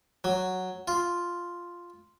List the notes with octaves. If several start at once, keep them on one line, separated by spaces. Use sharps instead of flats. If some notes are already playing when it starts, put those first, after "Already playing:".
F#3
F4